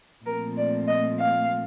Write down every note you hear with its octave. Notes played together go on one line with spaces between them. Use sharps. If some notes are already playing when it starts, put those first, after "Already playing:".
A#2 F3 A3 C4 A#4
D5
D#5
F5